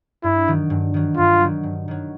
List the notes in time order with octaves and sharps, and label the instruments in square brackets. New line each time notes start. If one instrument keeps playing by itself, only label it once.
[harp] G2 [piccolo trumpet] E4
[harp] D#3 F#3
G2
D#3 F#3
[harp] G2 [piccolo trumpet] F4
[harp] D#3 F#3
G2
D#3 F#3